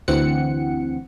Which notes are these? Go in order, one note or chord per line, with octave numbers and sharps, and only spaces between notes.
D2 E3 C4 F#5 C#7